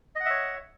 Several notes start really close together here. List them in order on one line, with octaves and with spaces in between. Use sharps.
D#5 F#5 E5 C#5